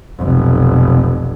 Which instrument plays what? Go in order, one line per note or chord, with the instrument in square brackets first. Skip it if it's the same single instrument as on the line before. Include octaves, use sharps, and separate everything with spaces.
[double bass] F1 B1